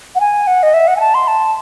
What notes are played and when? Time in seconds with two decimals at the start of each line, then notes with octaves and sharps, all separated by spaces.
0.15 F#5
0.20 G#5
0.47 F#5
0.63 D#5
0.74 E5
0.88 F#5
0.97 G#5
1.00 A5
1.15 C6
1.28 A5